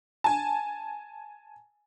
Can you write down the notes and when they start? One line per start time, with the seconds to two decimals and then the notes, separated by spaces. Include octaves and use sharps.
0.24 G#5 A5